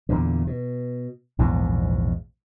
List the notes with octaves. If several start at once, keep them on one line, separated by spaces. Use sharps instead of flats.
E2 A#2 D3
B2
A#1 E2 G#2 B2